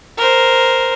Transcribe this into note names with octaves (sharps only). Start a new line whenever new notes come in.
A#4 C5